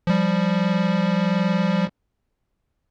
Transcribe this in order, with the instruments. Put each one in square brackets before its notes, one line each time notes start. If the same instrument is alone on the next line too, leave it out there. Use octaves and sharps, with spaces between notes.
[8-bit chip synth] F3 G3